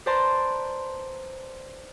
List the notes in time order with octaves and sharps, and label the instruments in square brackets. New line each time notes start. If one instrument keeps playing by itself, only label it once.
[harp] B4 C5 D5 A5 A#5 C6